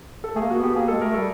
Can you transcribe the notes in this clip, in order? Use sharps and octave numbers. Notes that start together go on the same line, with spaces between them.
A4
A3 G#4
A#3
F#4
B3 G4
A#3 G#4
G#3 A4
A3 A#4
G3 A4